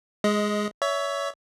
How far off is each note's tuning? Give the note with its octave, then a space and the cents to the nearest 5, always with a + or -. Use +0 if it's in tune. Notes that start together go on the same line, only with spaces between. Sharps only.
G#3 +0 D#5 +20
C#5 +25 E5 +0